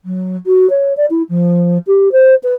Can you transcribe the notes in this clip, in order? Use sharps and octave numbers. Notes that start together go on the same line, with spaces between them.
F#3
F#4
C#5
D5
E4
F3
G4
C5
B4